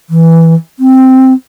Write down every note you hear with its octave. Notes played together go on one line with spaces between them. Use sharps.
E3
C4